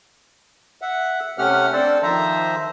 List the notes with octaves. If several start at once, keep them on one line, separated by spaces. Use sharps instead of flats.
E5 F#5
C3 A3 C#4 G4 F#5 F6
C4 D4 A4 C5 D5
D#3 F3 C5 E5 A#5